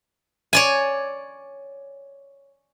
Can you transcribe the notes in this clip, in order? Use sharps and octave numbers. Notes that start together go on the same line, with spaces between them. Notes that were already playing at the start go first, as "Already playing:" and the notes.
C#5 D5 G#5